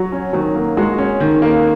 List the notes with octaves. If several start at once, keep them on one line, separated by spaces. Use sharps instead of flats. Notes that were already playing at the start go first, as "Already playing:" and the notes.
Already playing: F#3 F#4
C#4
D#3 F#3
A#3
G#3 F#4
C#4
D#3
A#3